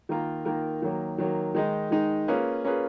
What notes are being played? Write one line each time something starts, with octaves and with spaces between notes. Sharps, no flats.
D#3 A#3 F4 A#4
D#3 A#3 F4 A#4
D#3 F#3 A#3
D#3 F#3 A#3
D#3 G#3 D#4
D#3 G#3 D#4
A#3 C#4 F4 G#4 B4
A#3 C#4 F4 G#4 B4